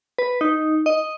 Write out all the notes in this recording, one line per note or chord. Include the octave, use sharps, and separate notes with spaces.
B4
D#4
D#5